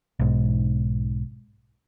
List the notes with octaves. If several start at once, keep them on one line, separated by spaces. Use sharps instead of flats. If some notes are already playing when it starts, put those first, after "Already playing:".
B1 G#2